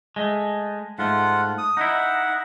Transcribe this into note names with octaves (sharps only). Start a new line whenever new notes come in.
G#3 A3
G#2 A3 F4 F#5
D#6
D#4 E4 F#5